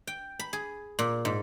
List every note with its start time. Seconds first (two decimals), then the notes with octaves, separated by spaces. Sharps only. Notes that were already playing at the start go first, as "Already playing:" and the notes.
0.07 G5
0.39 B5
0.53 G#4
0.99 A#2
1.25 G#2